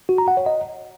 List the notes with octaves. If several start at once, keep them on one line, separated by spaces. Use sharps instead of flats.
F#4
A#5
F#5
C#5
D#5